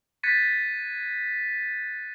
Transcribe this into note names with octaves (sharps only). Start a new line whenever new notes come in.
F#6 G#6 A6 B6 C#7 D#7